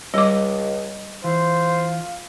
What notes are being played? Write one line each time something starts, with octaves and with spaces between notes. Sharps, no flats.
C#2 G3 D#5 D6
E3 F4 C5